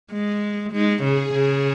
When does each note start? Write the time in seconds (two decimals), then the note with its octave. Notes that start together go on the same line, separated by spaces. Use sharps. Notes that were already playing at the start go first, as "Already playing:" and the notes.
0.11 G#3
0.72 G#3 D#4
1.03 C#3 G#4
1.33 C#3